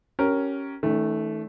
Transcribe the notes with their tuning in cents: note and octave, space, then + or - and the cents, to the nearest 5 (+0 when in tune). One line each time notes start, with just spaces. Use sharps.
C#4 +0 G4 -25 A#4 +0
D#3 +40 A3 -10 C#4 +45